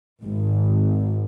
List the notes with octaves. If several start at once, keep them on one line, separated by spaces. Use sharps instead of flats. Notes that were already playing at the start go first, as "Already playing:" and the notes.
G#1